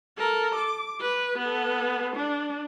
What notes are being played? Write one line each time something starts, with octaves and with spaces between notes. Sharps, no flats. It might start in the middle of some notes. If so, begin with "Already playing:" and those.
A4 A#4
D6
B4
B3 A4
D4